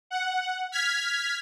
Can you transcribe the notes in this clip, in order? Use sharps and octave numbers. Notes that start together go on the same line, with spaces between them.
F#5
F6 G#6 B6